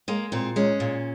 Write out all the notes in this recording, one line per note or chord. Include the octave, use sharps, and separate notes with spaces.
G#3 A#3
A#2 C4
G#3 C#4
A#2